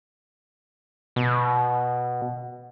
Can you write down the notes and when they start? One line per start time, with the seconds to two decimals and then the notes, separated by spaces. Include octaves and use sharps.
1.16 B2